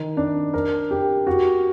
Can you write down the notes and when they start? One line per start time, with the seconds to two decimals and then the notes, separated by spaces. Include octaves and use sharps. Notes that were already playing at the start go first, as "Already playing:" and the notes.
Already playing: D#3
0.17 D4
0.54 A#4
0.91 G4
1.27 F#4